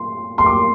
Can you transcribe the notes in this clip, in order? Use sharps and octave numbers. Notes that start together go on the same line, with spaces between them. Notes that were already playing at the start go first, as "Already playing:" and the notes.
Already playing: C6
C6
D6